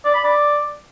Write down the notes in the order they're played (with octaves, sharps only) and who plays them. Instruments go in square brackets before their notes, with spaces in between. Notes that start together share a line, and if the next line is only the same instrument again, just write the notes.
[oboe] D5
B5
D5